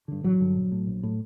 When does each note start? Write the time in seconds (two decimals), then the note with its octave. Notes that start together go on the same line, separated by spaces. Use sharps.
0.08 G2 D3
0.23 A1 F#3
0.40 G2 D3
0.56 A#1
0.72 A2
0.87 A#1
1.03 A2